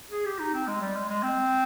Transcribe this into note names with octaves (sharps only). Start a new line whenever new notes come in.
G#4
G4
D#4
C4
G#3
G3
G#3
G#3
C4